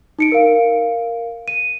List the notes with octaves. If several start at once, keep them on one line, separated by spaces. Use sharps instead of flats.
D#4 C#7 D7
A#4 F5
D#7